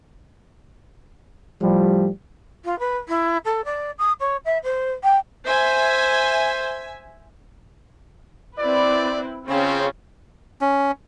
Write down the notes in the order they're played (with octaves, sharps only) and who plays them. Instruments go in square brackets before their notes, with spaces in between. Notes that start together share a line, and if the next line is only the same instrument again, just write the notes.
[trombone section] A2 F3 G3
[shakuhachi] F4
B4
E4
A4
D5
D#6
C#5
E5
C5
G5
[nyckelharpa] C5 [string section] E5 G#5
[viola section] C4 E4 B4 [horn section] D5
[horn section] C#3 C4 [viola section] C#4 F4 G#4
[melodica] C#4